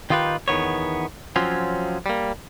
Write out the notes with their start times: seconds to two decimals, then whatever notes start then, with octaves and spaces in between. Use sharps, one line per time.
0.10 D#3 D#4 F4 G4 B4
0.48 E2 D#3 B3 C#5
1.36 F3 F#3 C4 C#4 F4
2.06 G3 A#3